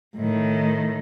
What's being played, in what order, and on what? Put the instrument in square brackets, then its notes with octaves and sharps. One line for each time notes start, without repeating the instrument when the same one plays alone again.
[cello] A2 D#3